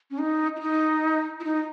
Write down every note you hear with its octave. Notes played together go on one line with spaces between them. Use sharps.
C#4
D#4
E4
D#4
E4
D#4